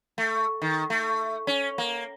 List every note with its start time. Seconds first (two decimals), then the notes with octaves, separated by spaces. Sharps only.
0.18 A3
0.62 D#3
0.90 A3
1.47 C#4
1.78 A#3